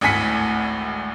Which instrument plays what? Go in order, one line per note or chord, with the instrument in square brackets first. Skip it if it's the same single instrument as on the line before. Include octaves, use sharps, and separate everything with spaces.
[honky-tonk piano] G#1 D2 A2 G#5 B6 C#7